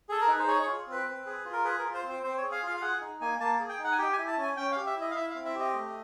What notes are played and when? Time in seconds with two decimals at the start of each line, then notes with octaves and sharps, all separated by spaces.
0.09 G#4 A4
0.21 A#4
0.28 D#4 B4
0.39 C5
0.48 G#4 C#5
0.62 C#5
0.68 F4
0.87 C4 B4
1.06 C4
1.26 G#4
1.46 F4
1.53 A#4
1.65 G#4 B4
1.79 F4 A#4
1.94 C5
2.04 C4
2.09 C5
2.23 C4 C5
2.38 G#4 C#5
2.52 F5
2.63 F4 F5
2.77 F5
2.82 G#4 F#5
3.01 D#4
3.21 A#3 G#5
3.40 A#3 A5
3.60 G#4
3.69 G5
3.79 D#4
3.84 F#5
3.92 G#5
3.98 G4 G5
4.13 E4 G#5
4.28 A5
4.38 C#4 G#5
4.57 C#4 G5
4.72 G4 F5
4.86 E5
4.96 E4 D#5
5.11 F5
5.16 E4 E5
5.30 C4 F5
5.45 E5
5.55 G4 D#5
5.74 A3